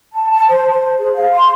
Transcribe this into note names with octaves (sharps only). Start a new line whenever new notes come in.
A5
A5
C5
C5
G#4
F5
C6